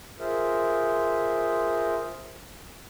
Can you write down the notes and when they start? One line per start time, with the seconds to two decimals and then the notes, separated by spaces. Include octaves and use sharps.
0.20 F4 G#4 A#4 C5 E5